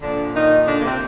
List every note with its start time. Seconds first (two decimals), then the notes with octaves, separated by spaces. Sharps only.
0.01 A#2 D3 F3 D4
0.35 D#3 D#4
0.68 D3 D4
0.79 A#3
0.84 C3 C4